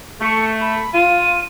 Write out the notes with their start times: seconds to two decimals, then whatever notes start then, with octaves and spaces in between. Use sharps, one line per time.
0.21 A3 C#6
0.61 B5
0.94 F4 D#7